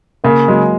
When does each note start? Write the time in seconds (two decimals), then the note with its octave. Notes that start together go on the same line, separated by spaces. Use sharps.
0.24 C#3 A#3
0.48 F#3 G#3